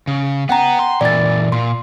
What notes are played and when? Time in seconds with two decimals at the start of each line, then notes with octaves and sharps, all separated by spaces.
0.07 C#3
0.49 B3 F#5 G5 A#5
0.79 C6
1.01 A#2 E3 D5 A6
1.52 A#2 C6